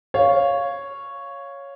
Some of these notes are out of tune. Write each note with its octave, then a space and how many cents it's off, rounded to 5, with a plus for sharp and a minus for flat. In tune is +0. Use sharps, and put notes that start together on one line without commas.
C#5 +0 F5 +0